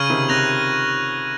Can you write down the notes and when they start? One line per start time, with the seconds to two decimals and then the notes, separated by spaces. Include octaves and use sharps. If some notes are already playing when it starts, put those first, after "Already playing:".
Already playing: C#3 C#6 F6 G#6 D#7 F#7
0.09 C3 D#3
0.29 C3 F#6 A#6 F7